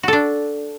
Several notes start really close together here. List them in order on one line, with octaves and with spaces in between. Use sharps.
F#4 A4 D4